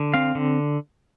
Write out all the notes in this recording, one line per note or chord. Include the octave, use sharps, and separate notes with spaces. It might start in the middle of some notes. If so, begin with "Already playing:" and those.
Already playing: D3
C4 F5
D3